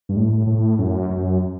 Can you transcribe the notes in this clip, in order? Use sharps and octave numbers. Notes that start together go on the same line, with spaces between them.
G2
A2
A2
F#2
F#2